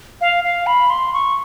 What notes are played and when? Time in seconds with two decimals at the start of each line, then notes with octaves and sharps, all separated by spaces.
0.21 F5
0.44 F5
0.67 B5
0.90 C6
1.14 C#6